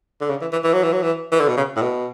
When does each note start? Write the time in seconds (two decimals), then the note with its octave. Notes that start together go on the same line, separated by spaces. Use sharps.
0.21 D3
0.30 C#3
0.41 E3
0.52 E3
0.64 E3
0.73 F#3
0.83 E3
0.93 F#3
1.02 E3
1.32 E3
1.40 D3
1.48 B2
1.57 C#3
1.76 A2
1.82 B2